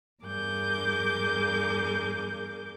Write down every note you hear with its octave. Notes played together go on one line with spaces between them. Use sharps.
E2 G2 G#4 A#4 D6 G6